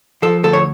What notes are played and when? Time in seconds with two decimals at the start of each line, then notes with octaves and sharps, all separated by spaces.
0.22 F3 A4
0.43 D2 A4
0.53 C#5